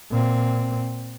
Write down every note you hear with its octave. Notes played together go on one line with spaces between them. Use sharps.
A#2 C4